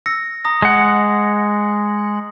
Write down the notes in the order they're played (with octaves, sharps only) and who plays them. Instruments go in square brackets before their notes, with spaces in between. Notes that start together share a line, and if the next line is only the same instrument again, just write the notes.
[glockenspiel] E6 A#6 C#7
A#5 D#6 A#6
[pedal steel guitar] G#3 F#5